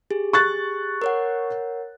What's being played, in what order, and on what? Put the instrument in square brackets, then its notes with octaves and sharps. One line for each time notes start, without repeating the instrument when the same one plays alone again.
[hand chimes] G4 G#4
[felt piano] C#6 F#6 A6
[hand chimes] A#4 C#5 F#5